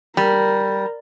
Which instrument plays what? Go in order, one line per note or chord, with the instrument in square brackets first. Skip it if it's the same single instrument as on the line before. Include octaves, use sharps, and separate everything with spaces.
[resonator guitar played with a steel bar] G3 [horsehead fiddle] A#4